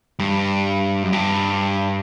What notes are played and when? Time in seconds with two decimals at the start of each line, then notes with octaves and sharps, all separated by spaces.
0.19 G2
1.03 F#2
1.13 G2